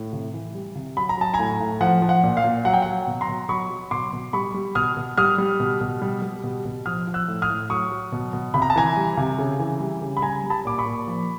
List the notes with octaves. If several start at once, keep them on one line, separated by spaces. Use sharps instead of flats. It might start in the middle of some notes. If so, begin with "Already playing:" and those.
Already playing: A2
C3
E3
G3
C3
F#3 B5
A#5
F#3 A5
G#5 A#5
A2
A2
F3 F#5
F3
F#5
A#2
F5
A#2
F#3 F#5
G5
F#5
F#3
B2
A#5 C6
B2
F#3 B5 C#6
F#3
B2 C6 D6
B2
G3 B5 C#6
G3
B2 D#6 F6
B2
G3 D#6 F6
G3
B2
B2
G3
G3
B2
B2
F3 D#6 F6
F3
E6 F#6
A2
D#6 F6
A2
F#3 C#6 D#6
F#3
B2
B2
C3 B5
A#5
A5
E3 G#5 A#5
G3
C3
C#3
E3
G3
C#3
B5
G3 G#5 A#5
G3
A5 B5
A#2 D6
B5 C#6
A#2
F3